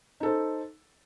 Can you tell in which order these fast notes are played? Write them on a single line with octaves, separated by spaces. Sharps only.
D#4 A4 C5